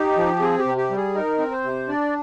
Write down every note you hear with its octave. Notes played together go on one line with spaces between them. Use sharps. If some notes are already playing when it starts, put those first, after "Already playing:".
Already playing: D#4 G4
F3
C4 G#4
G4
C3
G4
G3
G#4
D#4 A#4
C4
C5
C3
D4 D5